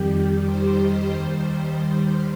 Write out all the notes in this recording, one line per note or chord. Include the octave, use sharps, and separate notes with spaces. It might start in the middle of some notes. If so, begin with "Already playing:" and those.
Already playing: F2 D#3 G3 G4
C5
D#5
D#2 D#3 G3 C5